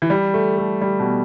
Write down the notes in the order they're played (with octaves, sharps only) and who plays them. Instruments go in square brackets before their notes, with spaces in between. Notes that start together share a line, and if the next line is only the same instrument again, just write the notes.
[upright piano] E3
G3
A3
A3
G3
B2